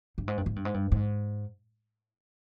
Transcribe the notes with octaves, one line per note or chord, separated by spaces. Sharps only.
G2
G#2
G2
G#2
G2
G#2
G2
G#2